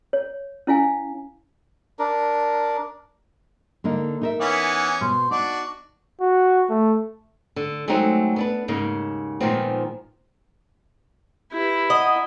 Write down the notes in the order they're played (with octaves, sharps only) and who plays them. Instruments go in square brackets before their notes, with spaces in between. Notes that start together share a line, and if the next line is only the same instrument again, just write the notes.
[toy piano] C#5
C#4 E4 F5 G#5
[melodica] D4 A#4
[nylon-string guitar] D3 A#3 D#4
D#4 A#4 E5
[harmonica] E3 B3 C#4
[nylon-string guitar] B2 B3 [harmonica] C5
[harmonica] D4 F#4 D5 [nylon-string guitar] D#4
[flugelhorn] F#4
A3
[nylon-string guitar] D3
F#3 G#3 A3 C4 D#4
B3 D4 B4
D#2 G#2 C#3 A#3 D#4
A#2 D#3 F3 G#3 B3 C4
[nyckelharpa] E4 [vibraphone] G4 B4
[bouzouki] D#5 [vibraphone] F#5 A#5 D#6